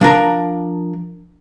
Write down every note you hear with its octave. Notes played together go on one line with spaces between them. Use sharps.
F3 D4 A#4 A#5